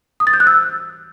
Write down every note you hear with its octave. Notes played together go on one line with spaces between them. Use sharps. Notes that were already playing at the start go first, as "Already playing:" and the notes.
D#6
A6
G6
F#6
E6